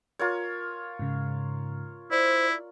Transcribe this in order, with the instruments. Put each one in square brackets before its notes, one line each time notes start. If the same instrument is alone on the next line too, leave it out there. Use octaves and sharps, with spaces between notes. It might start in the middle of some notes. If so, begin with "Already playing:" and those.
[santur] F4 A#4 C#5
[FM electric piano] G#2 C#3
[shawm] E4 [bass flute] C5 [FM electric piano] D5